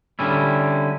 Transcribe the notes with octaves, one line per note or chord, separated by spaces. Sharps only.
D3 G3 C#4 E4